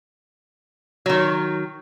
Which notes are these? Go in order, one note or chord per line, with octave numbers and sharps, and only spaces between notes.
D#3 F#3